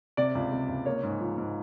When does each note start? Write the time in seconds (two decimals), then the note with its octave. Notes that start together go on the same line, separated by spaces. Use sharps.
0.17 C3 D5
0.35 C#2
0.52 C3
0.69 C#2
0.86 A#3 C#5
1.03 G#2
1.21 F3
1.38 G#2